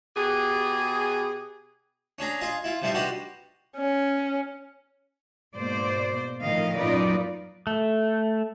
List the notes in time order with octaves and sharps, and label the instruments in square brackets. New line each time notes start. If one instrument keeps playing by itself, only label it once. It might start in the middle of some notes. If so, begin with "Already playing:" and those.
[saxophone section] B2 G4 G#4
[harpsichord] C#4 D4 G#4 A#5
F4 G#4 D#5
E4 F4
C3 F3 G3 D#4 C5 E5
D4 F#4 G4 B4 C5 D#5
[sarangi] C#4
[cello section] G#2 B2 A#3 C5 D5
A2 D#3 F3 D#5 F5
F#2 A#2 D#4 F4 B4 D5
[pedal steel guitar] A3